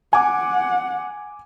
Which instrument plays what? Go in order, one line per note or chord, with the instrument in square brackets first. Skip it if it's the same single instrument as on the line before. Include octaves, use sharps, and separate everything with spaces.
[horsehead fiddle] F#5 [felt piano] G#5 D6